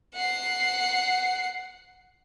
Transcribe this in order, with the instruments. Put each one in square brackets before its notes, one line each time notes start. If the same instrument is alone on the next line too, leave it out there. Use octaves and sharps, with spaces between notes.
[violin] F#5 C7